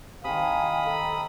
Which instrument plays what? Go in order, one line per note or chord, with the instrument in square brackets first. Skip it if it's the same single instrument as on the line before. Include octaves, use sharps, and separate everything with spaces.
[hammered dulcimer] C3 D#3 [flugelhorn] F5 [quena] G#5 [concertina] B5 D#6
[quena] A4 [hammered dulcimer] A#4